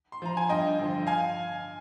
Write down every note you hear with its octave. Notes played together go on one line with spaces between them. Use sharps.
C6
F3 A#5
G#5
G2 D#5 G5
D3 F3
F5 G#5